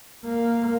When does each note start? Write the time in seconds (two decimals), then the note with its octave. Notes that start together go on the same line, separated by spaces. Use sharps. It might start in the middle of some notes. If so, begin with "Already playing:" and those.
0.24 A#3